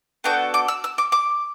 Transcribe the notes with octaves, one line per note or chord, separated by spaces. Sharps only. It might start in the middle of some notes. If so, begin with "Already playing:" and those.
B3 D4 F#4 A4 G5
D6
E6
E6
D6
D6